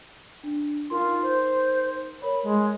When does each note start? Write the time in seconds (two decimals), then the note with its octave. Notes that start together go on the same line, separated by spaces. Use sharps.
0.44 D4
0.90 D#4 F4 A#4 C6
1.23 C5
2.22 A#4 C#5 B5
2.43 G#3